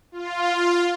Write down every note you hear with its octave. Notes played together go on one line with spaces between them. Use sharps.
F4